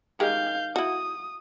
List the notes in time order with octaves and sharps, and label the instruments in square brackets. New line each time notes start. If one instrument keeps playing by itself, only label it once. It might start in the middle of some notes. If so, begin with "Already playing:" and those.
[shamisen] D#3 G#3 G4 [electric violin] F5 G6
[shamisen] E4 F#4 [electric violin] D#6